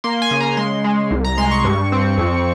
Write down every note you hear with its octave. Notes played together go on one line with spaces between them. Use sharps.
A#3 C6
G#5
C#3
A#5
G#3 C6
G#3
C2
A#5
G#3 C6
C#6
G2
C4
F2